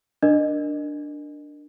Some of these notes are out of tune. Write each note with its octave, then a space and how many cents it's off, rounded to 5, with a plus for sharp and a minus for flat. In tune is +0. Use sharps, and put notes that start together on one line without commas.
D4 +0 A#4 +0 D#5 -25